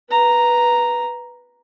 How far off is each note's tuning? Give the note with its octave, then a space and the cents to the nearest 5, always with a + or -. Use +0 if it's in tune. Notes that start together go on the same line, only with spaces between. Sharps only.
B4 -10 A#5 +0